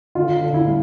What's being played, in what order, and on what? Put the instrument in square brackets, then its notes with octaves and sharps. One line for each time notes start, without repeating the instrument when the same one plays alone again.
[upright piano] D3 F4
D3
E4
G3